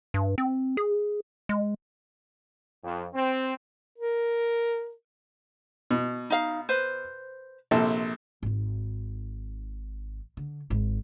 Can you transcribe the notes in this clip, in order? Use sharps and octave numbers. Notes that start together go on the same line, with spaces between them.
G2
C4
G#4
G#3
F2
C4
A#4
B2
D#4 F5
B4 C5
A#1 C3 A4
G#1 D#4
D3
G#1 G#2